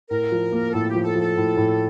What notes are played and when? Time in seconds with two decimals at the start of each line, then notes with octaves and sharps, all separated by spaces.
0.10 A2 A#4
0.32 F3
0.53 A#3
0.74 A2 A4
0.90 F3 G4
1.05 A4
1.15 F3
1.21 A4
1.37 A2
1.57 A2